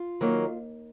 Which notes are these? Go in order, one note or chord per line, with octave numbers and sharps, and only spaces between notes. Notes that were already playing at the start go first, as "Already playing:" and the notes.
Already playing: F4
D#3 F#3 A#3